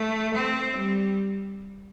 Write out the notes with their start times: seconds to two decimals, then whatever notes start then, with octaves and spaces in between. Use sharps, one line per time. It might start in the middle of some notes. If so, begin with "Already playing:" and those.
Already playing: A3
0.34 C4
0.76 G3